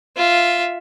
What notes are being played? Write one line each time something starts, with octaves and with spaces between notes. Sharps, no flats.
F4 E5